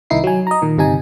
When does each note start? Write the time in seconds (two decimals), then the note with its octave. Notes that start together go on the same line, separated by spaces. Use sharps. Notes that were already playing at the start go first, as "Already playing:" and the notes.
0.10 C2 D#3 D#4 E4 C7
0.24 F#3 G#5
0.47 D#5 A#5
0.62 A#2 D#3
0.78 G1 C3 D#4 G#5